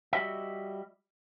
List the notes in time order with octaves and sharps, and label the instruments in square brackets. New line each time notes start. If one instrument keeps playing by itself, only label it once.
[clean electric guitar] G3 F#4 D#5 E5